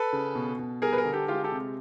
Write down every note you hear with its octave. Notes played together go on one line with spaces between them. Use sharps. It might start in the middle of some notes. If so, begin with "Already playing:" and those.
Already playing: A4 B4
C#3
B2
B2
G3 G#4 A#4
B4
G#4 A#4
D3
G4 A4
G#3 F4 G4
G4 A4
C3